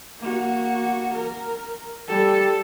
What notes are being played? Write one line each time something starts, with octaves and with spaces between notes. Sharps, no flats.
A#3 F#4
A#4
G3 A4